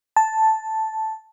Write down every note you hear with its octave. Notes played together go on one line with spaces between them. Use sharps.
A5